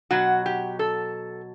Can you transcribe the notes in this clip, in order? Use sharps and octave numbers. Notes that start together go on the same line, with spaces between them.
B2 F#3 F#4
G4
A4